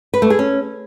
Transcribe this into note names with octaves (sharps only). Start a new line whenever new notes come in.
B4
A3
G#4
C#4